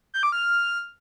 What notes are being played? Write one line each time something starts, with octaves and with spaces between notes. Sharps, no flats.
G6
D6
F6